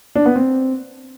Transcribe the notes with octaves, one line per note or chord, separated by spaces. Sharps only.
D4
B3
C4